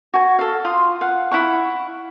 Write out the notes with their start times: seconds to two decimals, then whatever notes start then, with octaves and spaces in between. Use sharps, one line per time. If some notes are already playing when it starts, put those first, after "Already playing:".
0.14 F#4 G#5
0.39 A4 F5
0.65 F4 C6 D#6
1.01 F5 F#5
1.31 E4 F#5 C#6